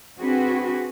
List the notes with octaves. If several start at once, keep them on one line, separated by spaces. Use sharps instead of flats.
C4 D4 F#4 G#4 B4